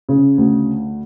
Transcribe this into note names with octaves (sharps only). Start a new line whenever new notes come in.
C#3
D2